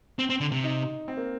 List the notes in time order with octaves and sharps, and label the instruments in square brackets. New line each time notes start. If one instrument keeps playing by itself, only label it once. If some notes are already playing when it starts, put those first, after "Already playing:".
[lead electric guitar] C4
C4
D3
C3
[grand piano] D#4
C4
A#3